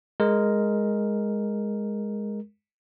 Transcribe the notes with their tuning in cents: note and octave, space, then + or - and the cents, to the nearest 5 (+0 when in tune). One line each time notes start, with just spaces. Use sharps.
G#3 +0 A#4 +0